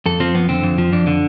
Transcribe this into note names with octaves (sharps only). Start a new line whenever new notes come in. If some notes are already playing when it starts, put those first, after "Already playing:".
F2 A4
F3 C4
F2 B3
D3 C4
F2
F3
F2 D4
D3